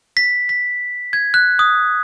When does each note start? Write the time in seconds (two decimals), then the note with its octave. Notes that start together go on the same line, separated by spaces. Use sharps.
0.17 B6
0.49 B6
1.13 G#6
1.34 F#6
1.59 D#6